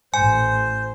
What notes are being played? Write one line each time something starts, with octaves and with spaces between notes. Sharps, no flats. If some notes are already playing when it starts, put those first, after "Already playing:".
A1 C5 G#5